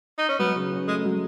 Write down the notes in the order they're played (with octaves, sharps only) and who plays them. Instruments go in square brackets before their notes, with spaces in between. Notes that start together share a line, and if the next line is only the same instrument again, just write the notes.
[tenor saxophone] D#4
C#4
[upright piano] F#3 [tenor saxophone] B3
[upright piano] C#3
C#4
[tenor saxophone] G#3 [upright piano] A3
[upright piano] F#3